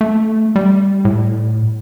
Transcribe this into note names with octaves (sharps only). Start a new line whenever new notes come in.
A3
G3
A2